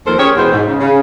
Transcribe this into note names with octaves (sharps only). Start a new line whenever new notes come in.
D#2 F3 A3 A4 A#4 C5
C#4 G4 G#4 A#4 C#5
E2 B2 G#3 B3 C5
G#2
C#3
C#3